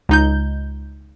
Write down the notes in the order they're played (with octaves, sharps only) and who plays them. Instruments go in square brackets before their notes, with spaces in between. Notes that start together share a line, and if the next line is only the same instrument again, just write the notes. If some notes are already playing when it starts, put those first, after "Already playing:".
[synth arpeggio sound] C#2 D#4 G6